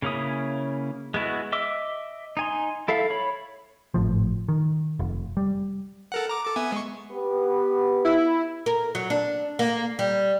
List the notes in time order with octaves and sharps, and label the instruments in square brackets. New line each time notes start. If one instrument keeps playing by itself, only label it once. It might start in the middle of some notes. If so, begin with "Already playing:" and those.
[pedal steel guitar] C#3 A#3 C#4 E4 D#6
G#3 B3 E4 F#4
D#5 E5 D6 E6
D#4 G#5 C6
E4 A4 E5 F5
C#5 B5
[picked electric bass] G#1 A2 F3
D#3
F1
G3
[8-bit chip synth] A4 A#4 F#5
A#5 D6
A4 D6
B3 E5 G#5
G#3 C#6
[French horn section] B3 G4
[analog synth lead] E4
[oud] A#4
F#3
D4
A#3
G3